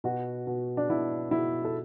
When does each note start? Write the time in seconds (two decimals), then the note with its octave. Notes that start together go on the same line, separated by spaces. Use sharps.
0.04 B2 F#4
0.47 B2
0.77 D4
0.89 B2 E4
1.31 B2 E4
1.65 A4